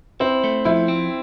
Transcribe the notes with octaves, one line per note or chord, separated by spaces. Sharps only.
C4 E4
A3
F3 E4
C4